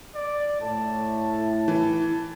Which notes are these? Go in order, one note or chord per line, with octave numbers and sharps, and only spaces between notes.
D5
A2 A5
E3